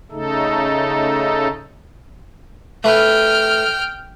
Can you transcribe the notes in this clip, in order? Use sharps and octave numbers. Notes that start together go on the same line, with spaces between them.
C#3 A3 D#4 A4
A3 B4 G5 F6